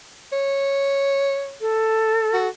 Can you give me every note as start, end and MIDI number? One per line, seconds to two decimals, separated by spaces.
0.33 1.56 73
1.61 2.46 69
2.33 2.49 66